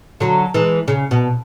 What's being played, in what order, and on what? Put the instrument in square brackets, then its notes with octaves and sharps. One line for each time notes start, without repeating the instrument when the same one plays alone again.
[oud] D3 F#3
E3 G#3
C#3
B2